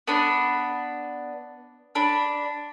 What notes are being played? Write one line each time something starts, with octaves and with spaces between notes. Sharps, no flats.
B3 D4 B5
D4 B5